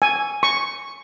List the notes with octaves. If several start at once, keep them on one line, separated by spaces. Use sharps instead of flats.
G#5
C#6